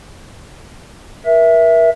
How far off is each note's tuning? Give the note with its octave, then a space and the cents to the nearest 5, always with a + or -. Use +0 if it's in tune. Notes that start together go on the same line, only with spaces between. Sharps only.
A#4 +40 E5 +0